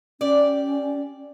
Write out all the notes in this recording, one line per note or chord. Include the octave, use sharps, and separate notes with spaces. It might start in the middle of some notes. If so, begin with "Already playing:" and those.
C#4 G4 D5